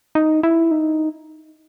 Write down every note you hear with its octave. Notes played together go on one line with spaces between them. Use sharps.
D#4
E4
D#4